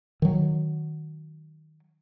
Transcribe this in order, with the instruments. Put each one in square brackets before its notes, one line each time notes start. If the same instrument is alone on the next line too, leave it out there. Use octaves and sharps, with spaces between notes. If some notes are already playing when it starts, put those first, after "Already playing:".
[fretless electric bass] D#3 F#3